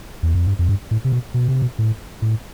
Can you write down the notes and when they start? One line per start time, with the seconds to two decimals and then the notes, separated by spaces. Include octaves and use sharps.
0.23 E2
0.35 F2
0.47 G2
0.59 F2
0.69 G2
0.91 A2
1.05 C3
1.12 B2
1.34 B2
1.48 C3
1.62 B2
1.79 A2
2.22 A2